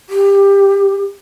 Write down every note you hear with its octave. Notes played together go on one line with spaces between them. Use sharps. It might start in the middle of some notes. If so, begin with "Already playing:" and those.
G4